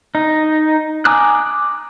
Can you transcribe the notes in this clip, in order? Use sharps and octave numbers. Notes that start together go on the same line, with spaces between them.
D#4
G#5 A#5 D6 D#6 F#6